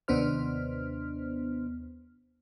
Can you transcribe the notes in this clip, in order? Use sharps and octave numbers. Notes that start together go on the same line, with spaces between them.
D#2 C3 B3 D4 C5 F6